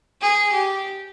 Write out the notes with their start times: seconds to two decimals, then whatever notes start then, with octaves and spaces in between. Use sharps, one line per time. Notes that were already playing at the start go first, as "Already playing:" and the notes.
0.21 G#4
0.53 G4